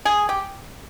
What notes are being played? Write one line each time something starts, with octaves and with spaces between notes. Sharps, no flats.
G#4
G4